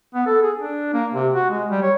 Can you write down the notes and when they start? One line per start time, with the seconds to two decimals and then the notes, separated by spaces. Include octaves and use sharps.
0.14 B3
0.26 A4
0.42 G#4
0.58 D4
0.94 A#3
1.14 C3
1.34 F#4
1.50 G#3
1.71 G3
1.83 C#5